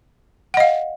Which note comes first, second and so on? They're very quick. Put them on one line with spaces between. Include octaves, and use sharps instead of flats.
F#5 D#5 F5